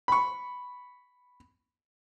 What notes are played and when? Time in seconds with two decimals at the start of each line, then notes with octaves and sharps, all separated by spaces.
0.08 B5 C#6